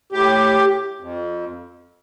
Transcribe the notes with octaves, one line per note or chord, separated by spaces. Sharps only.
A2 G4
F2